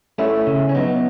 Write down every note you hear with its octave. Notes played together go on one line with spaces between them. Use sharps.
A3 C#4 E4
C#3
C#4
F#3 B3 D#4